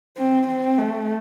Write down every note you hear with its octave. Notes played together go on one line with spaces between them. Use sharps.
C4
C4
A3